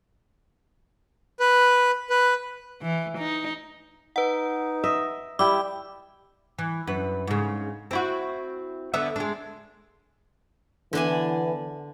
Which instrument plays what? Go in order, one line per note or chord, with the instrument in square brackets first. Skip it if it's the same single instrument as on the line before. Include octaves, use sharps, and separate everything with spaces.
[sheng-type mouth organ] B4
B4
[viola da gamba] E3
D#4
[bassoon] D#4 [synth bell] B4 F#5
[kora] D#5 E5
[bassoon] G3 [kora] E4 G4 [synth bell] D6
[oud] E3
F#2 B4
G#2 C#3
C4 E4 F#4
D3 B3 E5
G#3 D4
[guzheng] D3 D4 G#5 [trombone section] E3 B3